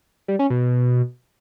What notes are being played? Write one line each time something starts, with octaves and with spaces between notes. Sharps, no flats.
G3
C#4
B2